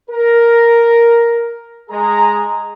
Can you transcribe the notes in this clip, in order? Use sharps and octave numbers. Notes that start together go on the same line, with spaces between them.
A#4
G#3 G#4 A#5